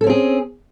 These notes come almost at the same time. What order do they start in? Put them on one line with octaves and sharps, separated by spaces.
A4 C#4 C4 G#4